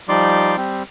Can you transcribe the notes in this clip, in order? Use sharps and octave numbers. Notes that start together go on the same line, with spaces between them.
F3 G3 D#4 D5 C6 D6
G3 C4